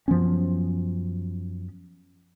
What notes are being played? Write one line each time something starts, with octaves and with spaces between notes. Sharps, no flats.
F#2 F3 B3 C#4